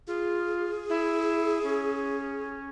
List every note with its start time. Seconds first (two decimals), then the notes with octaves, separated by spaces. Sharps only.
0.07 F4 G#4
0.90 E4
1.64 C#4